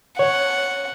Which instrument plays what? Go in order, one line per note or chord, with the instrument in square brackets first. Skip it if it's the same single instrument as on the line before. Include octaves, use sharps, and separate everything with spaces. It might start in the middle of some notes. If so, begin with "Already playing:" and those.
[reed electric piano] C#5 [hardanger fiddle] F#5